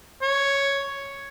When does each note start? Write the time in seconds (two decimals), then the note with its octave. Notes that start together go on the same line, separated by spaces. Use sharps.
0.22 C#5